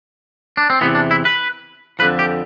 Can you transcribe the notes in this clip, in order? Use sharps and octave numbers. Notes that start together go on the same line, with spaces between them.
D4
C4
E2 C3 E3 B3
D4
E4
B4
F2 D3 F3 B4
G4